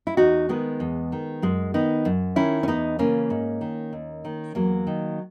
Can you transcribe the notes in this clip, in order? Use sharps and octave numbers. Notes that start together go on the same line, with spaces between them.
E4
E2 D#4 F#4
D#3 G#3 B3
E2
D#3
F#2 G#3
D#3 B3 D#4
F#2
D#3 C#4 E4
C#4
E2 B3 D#4
C#3 E3 A#3 C#4
G#2
D#3
D#2
D#3
E2 F#3 A#3
D#3